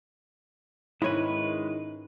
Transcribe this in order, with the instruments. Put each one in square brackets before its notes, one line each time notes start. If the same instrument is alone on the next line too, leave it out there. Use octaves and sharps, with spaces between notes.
[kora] G#2 C#4 [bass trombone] D#3 [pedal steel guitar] G#3 B4 [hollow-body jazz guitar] E4 C#5